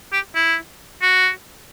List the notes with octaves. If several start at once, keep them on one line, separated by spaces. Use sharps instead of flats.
G4
E4
F#4